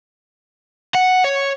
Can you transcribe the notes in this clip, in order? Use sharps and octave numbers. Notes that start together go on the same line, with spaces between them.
F#5
C#5